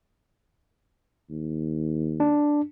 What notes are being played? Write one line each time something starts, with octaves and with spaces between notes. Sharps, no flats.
D#2
D4